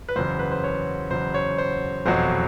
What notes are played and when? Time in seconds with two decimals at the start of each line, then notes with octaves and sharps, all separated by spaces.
0.09 B4
0.16 F#1 E2 C#3 F#3 C5
0.39 B4
0.51 C5
0.64 C#5
1.11 F#1 E2 C#3 F#3 C5
1.34 C#5
1.58 C5
2.06 F1 E2 B2 F#3 C5